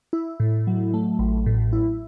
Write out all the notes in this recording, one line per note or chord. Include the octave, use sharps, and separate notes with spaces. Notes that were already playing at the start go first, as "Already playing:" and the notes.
E4
A2
F#3
A3
A1
A2
E4